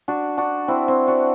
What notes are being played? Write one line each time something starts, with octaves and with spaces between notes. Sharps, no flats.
D4 F#4
D4 F#4
C4 E4
C4 E4
D4 F#4